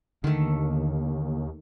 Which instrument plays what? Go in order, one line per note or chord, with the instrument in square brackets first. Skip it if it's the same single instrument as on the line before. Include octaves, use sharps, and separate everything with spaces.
[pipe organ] D#2 [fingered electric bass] D3 [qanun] D#3 A3